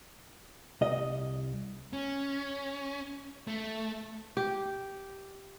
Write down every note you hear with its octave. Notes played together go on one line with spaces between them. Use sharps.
C2 D#5
C#4
A3
G4